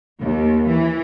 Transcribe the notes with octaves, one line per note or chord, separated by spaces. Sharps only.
D#2
E3